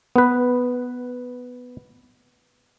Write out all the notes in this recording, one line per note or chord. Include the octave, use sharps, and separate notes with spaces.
B3 B4